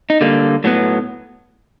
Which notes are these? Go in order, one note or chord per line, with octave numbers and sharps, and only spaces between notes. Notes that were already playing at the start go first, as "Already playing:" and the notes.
D#4
D3 G3 A#3
A2 F#3 B3